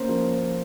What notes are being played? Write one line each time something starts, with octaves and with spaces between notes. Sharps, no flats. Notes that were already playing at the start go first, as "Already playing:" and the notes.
Already playing: A#3 C#4 C5
F3 A#4